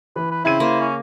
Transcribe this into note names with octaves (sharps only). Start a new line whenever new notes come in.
E3 B4
B4
C#3 C4 E4 G#6 D#7
A#3 C5
C#4